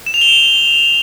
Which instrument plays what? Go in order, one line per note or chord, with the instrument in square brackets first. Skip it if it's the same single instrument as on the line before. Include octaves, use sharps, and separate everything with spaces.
[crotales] E7
F7
G7